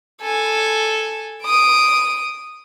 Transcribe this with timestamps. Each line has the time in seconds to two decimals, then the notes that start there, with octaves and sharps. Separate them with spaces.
0.21 A4 G#5
1.43 D#6 D7